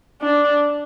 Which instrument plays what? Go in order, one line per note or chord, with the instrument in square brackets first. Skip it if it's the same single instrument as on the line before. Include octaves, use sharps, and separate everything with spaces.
[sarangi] D4